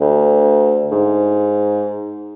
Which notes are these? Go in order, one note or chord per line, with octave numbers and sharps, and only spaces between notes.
D2
G#2